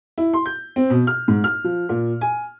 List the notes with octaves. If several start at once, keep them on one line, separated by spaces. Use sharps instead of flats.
E4
C6
G6
C4
B2
F6
G#2
F6
F3
A#2
G#5